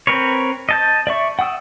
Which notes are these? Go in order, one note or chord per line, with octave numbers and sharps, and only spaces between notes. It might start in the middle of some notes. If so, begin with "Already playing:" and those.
C4 A#4 B4 C#5
D#5 A5 G6
D5 E5 C#6
F#5 G5 D#6 E6